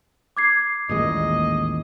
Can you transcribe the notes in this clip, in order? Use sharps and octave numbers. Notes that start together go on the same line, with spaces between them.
D6 G#6 C7
A1 D#2 A#2 G#3 D#5